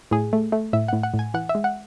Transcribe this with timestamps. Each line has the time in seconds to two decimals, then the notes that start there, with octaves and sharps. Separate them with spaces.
0.11 A2 G#4
0.33 A3
0.52 A3
0.73 A2 E5
0.88 A2 F#5
1.03 F#5
1.14 A2
1.19 G#5
1.34 E3 F#5
1.49 E5
1.55 G#3
1.64 F#5